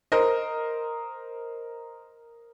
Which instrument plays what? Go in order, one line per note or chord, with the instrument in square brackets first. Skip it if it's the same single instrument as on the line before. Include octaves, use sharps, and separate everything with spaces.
[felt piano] A#4 C5 D#5